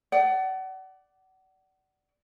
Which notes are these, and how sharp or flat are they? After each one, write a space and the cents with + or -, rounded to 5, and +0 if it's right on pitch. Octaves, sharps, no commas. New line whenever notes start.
D5 +0 F#5 +30